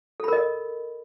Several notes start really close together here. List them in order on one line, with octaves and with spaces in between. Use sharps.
A4 B5 A#4 D#5